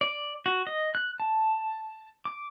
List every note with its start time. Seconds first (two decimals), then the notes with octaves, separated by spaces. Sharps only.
0.01 D5
0.46 F#4
0.67 D#5
0.95 F#6
1.20 A5
2.25 D6